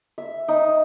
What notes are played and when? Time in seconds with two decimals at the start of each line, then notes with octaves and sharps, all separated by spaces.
0.18 E5
0.48 D#4